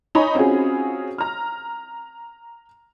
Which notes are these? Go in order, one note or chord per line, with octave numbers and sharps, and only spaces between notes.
D#4 C#5 G#5 A#5 B5
C4 C#4 F4 F#4 G#4
A#5 F6